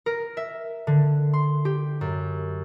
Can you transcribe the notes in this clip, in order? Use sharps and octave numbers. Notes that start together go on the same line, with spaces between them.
A#4
E5
D3
C6
G4
F#2